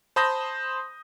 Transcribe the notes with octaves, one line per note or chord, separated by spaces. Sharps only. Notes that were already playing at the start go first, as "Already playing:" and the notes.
C5 A5 B5 D#6 G6 A#6